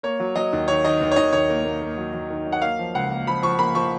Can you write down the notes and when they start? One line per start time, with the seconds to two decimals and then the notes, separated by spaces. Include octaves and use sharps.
0.03 A#3 C#5
0.20 F#3
0.35 F#3 D#5
0.53 D#2
0.68 D#3 C#5
0.85 D#3 D#5
1.01 D#2
1.12 C#5
1.16 D#2 D#5
1.33 D#2 C#5
1.50 A#3
1.65 A#3
1.82 A#3
1.98 F#3
2.14 F#3
2.30 D#3
2.47 F#3
2.52 F#5
2.62 A#3 F5
2.79 F3
2.95 C#2 F#5
3.11 A#3
3.27 F3 B5
3.43 F3 C#6
3.59 A#3 B5
3.75 F3 C#6